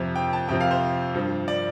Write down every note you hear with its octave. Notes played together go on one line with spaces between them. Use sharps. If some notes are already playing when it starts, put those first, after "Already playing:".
Already playing: F2 C3 F3
G5
A5
F2 C3 F3 G5
F5
C5
G2 F3
D5